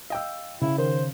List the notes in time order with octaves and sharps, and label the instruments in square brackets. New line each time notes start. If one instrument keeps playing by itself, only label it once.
[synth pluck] D#5 G5 [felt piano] F5 E6
[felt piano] C#3 [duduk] E4
[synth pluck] D#3 [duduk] C5